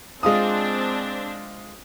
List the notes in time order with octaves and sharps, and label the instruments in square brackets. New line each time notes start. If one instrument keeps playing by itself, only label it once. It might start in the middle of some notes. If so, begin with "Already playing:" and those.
[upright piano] G#3 F4 D#6 [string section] C4 D4